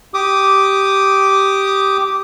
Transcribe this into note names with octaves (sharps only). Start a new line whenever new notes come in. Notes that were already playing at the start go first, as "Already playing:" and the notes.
G4 D6 D#6